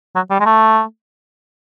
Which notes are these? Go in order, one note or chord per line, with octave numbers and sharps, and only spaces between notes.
F#3
G3
G#3
A3